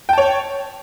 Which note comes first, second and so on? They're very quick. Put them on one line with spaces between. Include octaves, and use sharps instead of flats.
G5 A5 C#5